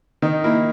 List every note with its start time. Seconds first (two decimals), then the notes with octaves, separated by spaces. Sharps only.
0.22 D#3 D#4
0.44 A#3 E4